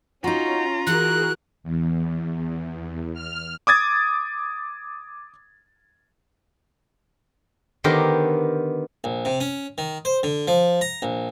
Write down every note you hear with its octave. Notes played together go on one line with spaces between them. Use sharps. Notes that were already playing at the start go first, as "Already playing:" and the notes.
C#4 D#4 F4 F#4 A#5
E3 F#4 G#4 A#4 F#6
E2
F6
D6 D#6 G#6 A6
D3 D#3 B3 G4 A#4 C5
A#1
C3
C#4
D#3
C5
D3
F3
A#5
A#1